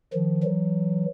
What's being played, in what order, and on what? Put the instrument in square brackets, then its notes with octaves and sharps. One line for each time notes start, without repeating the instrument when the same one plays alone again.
[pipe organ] D#3 F3
E3 F#3